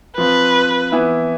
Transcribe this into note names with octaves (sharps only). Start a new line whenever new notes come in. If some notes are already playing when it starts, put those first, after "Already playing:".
F3 C4 F4 B4
E3 B3 E4